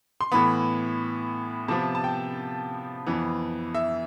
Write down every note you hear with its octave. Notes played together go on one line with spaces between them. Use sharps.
C6
A2 E3 B3 B5
C3 F3 B3 A5
A5
G5
F2 E3 B3
E5